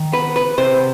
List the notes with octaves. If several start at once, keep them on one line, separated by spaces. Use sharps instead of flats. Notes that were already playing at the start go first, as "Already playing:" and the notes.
Already playing: D#3
B3 B4
B4
C3 C5